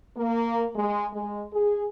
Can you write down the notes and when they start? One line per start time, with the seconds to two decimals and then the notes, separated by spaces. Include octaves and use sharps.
0.17 A#3
0.76 G#3
1.13 G#3
1.53 G#4